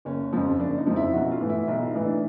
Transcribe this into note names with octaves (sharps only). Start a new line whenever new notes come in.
F#1 C#4
F2 C#3 F3
F#1 D4
D#4
F2 C#3 F3
E4
B1 F#4
F4
A2 E3
E4
B1 E4
A2 E3 D#4
D4